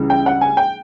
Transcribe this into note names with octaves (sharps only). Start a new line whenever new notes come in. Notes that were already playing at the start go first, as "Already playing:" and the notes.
Already playing: C#2 C#3 E3 G3
G5
F#5
G#5
G5